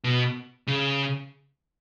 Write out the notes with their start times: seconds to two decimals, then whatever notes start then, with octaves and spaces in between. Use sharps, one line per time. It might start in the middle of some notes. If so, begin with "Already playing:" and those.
0.04 B2
0.67 C#3